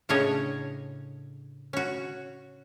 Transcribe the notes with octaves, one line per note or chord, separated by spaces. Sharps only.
A2 C#3 C#4 D4 C#5 D#5
C#4 F#4